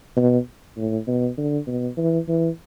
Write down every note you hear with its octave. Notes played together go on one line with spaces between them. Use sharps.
B2
A2
B2
D3
B2
E3
E3